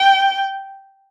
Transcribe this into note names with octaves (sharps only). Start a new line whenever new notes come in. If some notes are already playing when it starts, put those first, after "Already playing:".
Already playing: G5